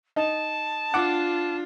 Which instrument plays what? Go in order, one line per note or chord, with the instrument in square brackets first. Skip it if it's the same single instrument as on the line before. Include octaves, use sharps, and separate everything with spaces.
[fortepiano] D#4 [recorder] A5
[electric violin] D4 F4 [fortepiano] F#5 D6